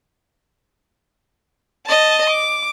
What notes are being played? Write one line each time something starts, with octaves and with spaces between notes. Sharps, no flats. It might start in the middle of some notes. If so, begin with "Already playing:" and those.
D#5 A5
D6